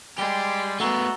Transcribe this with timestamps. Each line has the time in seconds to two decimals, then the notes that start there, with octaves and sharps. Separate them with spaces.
0.18 G3 G#3 G4 C6 A6 G7
0.80 A3 B3 F#4 A#5 E6 G7